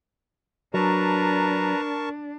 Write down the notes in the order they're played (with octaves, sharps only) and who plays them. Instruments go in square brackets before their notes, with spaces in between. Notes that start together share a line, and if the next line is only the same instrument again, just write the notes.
[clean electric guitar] F#3 [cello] D4 [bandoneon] A#4 A5 C#6 [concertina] B4 A#5